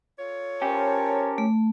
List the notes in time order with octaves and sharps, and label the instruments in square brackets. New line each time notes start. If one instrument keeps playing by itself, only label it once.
[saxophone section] F4 A4 C#5
[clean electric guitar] C#4 G4 [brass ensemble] A#4 C5 A5
[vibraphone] A3